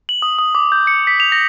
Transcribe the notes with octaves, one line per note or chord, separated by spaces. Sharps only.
F#7
D#6
D#6
D6
G6
C#7
B6
F7
A#6